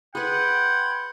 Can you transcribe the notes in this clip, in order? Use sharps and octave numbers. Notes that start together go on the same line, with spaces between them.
G#4 B4 F#5 G5 B5 C6 G#6